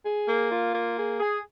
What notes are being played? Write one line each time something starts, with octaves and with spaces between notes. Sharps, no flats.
G#4
A#3
F4
A#3
G#4
G#4